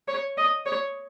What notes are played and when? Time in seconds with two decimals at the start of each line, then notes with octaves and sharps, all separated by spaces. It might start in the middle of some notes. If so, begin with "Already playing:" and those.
0.08 C#5
0.37 D#5
0.66 C#5